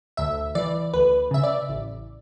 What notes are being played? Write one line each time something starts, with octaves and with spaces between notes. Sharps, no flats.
D2 E5
E3 D5
D2 B4
C#3 E5
D5
A1